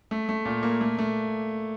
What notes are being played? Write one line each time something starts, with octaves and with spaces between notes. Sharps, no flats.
A3
A3
A#2
A#3
A3
A3